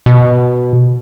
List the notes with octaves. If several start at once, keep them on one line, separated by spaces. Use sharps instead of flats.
B2